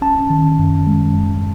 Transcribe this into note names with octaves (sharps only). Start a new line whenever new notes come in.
C#4 A5
D#3
F#2
G#3
F#2